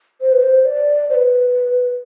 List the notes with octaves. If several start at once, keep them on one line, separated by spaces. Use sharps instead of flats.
C5
B4
C5
D5
C5
B4